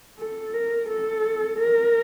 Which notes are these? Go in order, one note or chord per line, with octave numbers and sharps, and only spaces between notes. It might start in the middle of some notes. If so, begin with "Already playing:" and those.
A4
A#4
A4
A#4